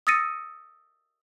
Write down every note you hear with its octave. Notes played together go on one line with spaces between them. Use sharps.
D#6 E6 A6 A#6 C#7 D#7